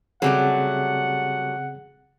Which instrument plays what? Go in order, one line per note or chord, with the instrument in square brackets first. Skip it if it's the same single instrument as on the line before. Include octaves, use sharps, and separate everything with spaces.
[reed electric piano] C#3 C4 G#4 [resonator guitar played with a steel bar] F#3 G3 A3 [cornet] F#5